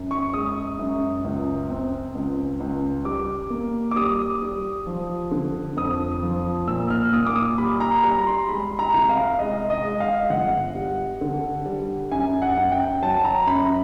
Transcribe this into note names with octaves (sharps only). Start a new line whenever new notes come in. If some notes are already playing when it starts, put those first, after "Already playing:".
Already playing: F#2
C#6
G#3 D#6
F#2
C#2
C4
C#2
C#2
G3 D6
A#3
D6
G3 D#6
G3
F3
D3
F2 D#6
F3
A#2 E6
F6
A#2 D#6
D6
D#6
G3 B5
A#5
G3 A#5
C6
G#3 B5
A#5
C2
F5
G#3 D#5
D#5
G#3
F5
G1 F#5
G3
D3
G3
F#2 G#5
F#5
F#2
G5
F#3 A5
A#5
F#2 B5